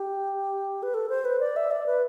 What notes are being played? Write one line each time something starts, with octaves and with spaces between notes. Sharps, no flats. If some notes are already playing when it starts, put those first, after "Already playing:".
Already playing: G4
B4
A4
C5
B4
D5
E5
D5
B4